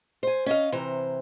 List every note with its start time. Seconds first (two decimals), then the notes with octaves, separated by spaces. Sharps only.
0.23 C5 G#5
0.46 C#4 D#5 F5
0.72 C3 E3 C5 A#5